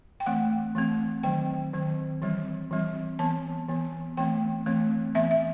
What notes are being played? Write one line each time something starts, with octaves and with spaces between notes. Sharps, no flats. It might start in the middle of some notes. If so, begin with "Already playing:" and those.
G5
E3 A3 C4 F#5
E3 A3 C4
D#3 F#3 C4 G5
D#3 F#3 C4
E3 G3 C4
E3 G3 C4
E3 B3 A5
E3 B3
E3 A3 C4 G5
E3 A3 C4
E3 B3 E5
E5